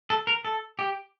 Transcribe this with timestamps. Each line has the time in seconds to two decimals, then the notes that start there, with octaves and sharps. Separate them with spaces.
0.10 A4
0.27 A#4
0.45 A4
0.79 G4